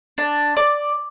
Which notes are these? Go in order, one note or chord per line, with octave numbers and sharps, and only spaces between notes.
D4
D5